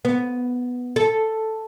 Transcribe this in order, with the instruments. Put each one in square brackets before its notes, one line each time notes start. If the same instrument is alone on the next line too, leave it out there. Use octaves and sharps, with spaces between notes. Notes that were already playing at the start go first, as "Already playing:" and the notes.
[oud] B3
A4